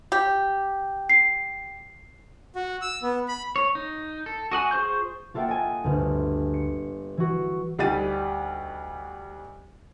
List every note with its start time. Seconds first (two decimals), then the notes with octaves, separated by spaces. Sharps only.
0.12 G4
1.10 C7
2.56 F#4
2.82 E6
3.03 B3
3.28 B5
3.56 C#5
3.75 D#4
4.26 A4
4.52 F#4 D#5 F#5 G#5
4.71 F4 G#4 C5 C#6 G6
5.34 A#3 F4 A4 E5 F#5 G5
5.48 D#5 G#5
5.84 G1 D2
6.54 C#7
7.17 E3 F#4
7.79 D2 G3 D#4 G4 A6 D#7